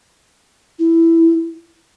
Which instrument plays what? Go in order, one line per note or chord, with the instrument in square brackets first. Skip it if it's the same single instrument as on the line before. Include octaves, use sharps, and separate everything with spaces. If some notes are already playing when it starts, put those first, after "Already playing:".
[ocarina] E4